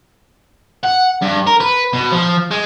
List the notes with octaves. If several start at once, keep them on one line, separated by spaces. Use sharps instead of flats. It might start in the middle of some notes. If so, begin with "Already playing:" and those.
F#5
G2
A#4
B4
B2
F3
G#3